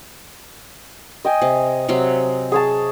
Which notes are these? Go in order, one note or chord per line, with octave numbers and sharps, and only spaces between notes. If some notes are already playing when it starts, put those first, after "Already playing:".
D#5 G5 G#5
C3
C3 F#3 C4
G#4 C#5 A5